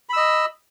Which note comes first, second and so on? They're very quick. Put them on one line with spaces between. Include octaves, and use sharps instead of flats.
B5 E6 D#5